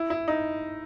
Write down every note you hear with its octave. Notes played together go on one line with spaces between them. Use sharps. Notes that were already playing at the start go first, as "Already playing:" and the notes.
Already playing: E4
E4
D#4